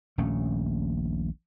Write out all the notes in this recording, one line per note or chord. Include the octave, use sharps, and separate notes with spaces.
D#1 A#1 A3 C#4